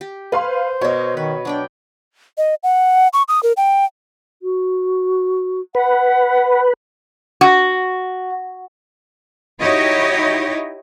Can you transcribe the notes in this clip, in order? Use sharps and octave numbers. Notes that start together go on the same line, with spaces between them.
G4
B4 F5 G#5 C6
C5
B2 A#4 C#5 D#5
D#3 B4
F#3 D4 D5 G5
D#5
F#5
C#6
D#6
A#4
G5
F#4
B4 F#5
F#4
D#4 E4 F#4 G4 C#5 D#5